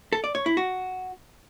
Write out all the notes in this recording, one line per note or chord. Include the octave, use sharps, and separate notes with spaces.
A4
D5
C#5
E4
F#4